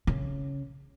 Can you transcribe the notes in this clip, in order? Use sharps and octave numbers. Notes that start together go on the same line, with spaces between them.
C#3